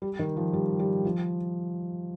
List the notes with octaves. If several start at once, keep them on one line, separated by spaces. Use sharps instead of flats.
G3
D#3
F3
G3
G3
F3